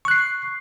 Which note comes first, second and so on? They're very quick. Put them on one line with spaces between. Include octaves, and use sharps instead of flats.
C#6 F#6 C7